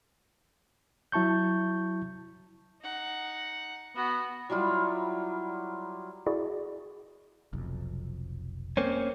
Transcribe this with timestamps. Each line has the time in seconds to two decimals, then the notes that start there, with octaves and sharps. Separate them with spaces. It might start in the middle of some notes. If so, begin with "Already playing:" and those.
1.12 F#3 E4 A5 C#6 G6
2.82 D#4 F#5
3.96 B3 F#4
4.49 F#3 G3 E4 F4
6.26 E4 F#4 G#4 D5
7.53 F1 B1 F2
8.77 A#3 C4 C#4